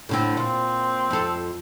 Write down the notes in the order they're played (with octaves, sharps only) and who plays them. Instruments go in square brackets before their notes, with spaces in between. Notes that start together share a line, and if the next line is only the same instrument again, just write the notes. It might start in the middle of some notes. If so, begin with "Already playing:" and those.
[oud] A2 D3 C4
[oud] A#2 [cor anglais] C4
[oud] F2 A4